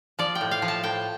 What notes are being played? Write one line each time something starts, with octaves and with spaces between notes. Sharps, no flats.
F3 D5
G5
A2
F5
F3
A5
A2 G5